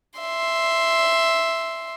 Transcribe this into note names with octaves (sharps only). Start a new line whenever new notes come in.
E5 C6